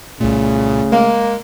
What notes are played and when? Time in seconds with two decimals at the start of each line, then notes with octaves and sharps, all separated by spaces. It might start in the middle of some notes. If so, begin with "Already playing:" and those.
0.21 C2 A#2 C#3 A3
0.92 G#3 A#3